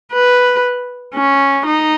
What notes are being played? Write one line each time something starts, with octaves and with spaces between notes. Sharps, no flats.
B4
C#4
D#4